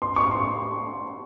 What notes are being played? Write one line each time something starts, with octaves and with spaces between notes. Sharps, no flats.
C6
C#6
C6